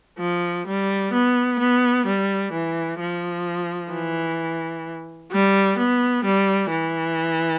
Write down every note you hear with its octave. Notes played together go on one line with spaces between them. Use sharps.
F3
G3
B3
B3
G3
E3
F3
E3
G3
B3
G3
E3